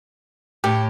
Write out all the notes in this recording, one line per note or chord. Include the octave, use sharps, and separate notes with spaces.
A2 G4